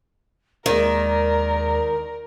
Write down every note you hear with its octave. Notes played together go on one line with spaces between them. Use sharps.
D#2 D#3 G#3 A#4 D5